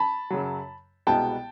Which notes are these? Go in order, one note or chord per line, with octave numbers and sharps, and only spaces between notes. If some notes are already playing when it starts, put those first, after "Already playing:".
Already playing: A5 B5
F#2 C#3 F#3
C2 B2 G#3 B3 G5 A5